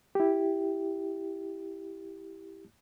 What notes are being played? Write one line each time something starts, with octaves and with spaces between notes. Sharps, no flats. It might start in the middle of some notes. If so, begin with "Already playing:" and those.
E4 G4